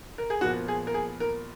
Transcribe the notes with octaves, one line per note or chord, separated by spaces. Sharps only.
A#4
G#4
A#2 F3 B3 F#4
G#4
A#4
G#4
A#4